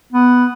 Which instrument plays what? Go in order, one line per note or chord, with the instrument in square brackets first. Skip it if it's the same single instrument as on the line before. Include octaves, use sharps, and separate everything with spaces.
[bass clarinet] B3